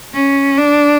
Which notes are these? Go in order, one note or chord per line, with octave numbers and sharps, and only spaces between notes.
C#4
D4